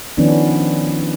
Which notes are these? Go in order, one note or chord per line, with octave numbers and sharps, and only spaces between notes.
D#3 F3 B3 C#4 D4